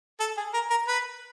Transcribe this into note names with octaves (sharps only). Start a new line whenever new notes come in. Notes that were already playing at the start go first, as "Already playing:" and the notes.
A4
G#4
A#4
A#4
B4